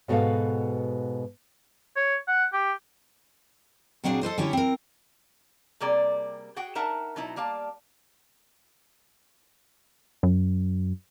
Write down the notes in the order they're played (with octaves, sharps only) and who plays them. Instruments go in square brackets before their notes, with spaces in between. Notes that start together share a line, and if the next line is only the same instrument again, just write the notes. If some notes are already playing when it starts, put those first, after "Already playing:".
[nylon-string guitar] G#2 B2 F#4 A4 B4 F5
[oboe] C#5
F#5
G4
[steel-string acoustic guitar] A#2 F#3 C4 D4 G#4
A4 B4 C5 D#5
D3 C#4 E4 G4 C#5
C4 A#4
[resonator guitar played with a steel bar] C3 G3 A#3 G#4 D5
F#4 G#4 F#5 G5
D#4 A#4 E5 F#5 A5
B2 F#3 D#4 E4
G3 A#3 F5 A5
[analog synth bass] F#2